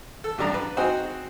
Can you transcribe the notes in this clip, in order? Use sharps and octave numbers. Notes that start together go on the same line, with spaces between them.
A4
A1 G2 D4 A#5
B4
C4 D#4 F#4 G#4 C5